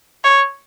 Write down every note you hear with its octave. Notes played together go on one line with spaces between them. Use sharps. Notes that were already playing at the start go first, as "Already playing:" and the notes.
C#5